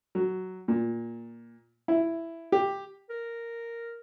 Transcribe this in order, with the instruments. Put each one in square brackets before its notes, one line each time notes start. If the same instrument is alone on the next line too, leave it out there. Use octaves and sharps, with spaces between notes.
[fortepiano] F#3
A#2
E4
G4
[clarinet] A#4